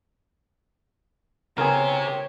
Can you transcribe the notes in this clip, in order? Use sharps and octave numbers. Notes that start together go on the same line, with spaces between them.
C#3 B3 G4 G#4 A#4 C5 C#5 G5